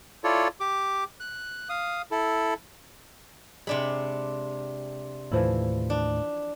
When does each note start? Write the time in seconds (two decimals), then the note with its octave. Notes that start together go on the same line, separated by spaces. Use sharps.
0.24 E4 F4 A4 C#5 D5
0.60 G4 D6
1.20 F#6
1.69 F5 D#6
2.11 E4 A4
3.67 C3 G#3 D4 B5
5.32 D#2 A2 E3 F3 E4
5.90 D4